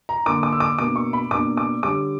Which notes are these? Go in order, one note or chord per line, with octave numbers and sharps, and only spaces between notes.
A#5
D3 A#3 D4 D6
D6
E6
D6
B2 A#3 D4 D6
C#6
B5
B2 A#3 D4 D6
D6
D3 G3 C#4 D6